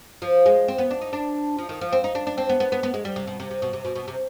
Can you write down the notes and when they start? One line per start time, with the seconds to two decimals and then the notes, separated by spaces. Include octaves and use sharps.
0.22 F3
0.46 G#3
0.68 C4
0.78 B3
0.91 D4
1.01 D#4
1.13 D4
1.58 F3
1.69 D#3
1.81 F3
1.92 C4
2.04 D#4
2.15 D4
2.27 D4
2.38 C4
2.49 B3
2.60 B3
2.72 B3
2.83 B3
2.94 G#3
3.05 G3
3.16 C3
3.27 B2
3.40 C3
3.51 C3
3.62 B2
3.73 C3
3.85 B2
3.95 B2
4.08 C3